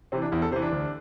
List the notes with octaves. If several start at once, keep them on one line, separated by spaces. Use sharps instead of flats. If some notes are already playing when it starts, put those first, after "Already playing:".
C3 E3 C4
D4
E2 E4
A4
C3 E3 C5
D4
D2